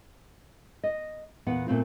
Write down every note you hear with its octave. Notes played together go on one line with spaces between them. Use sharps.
D#5
E2 A#2 B3 F#5
A#2 A3 C4 F4